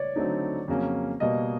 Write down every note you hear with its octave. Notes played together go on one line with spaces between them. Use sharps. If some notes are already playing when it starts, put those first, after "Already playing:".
Already playing: C#5 D5
D3 F#3 A3 C4 D#4
F2 C#3 F#3 A#3 C#4
B2 G3 A#3 D#5